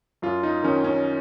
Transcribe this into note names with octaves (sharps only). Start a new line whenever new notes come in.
F#2 F4
D#4
D#3 C#4
C#4